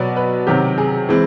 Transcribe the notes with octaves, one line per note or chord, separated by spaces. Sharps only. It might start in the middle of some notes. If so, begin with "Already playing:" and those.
Already playing: B2 F#3 B3 D5
B4
C3 D#3 F#3 G4
G#4
E3 G#3 C4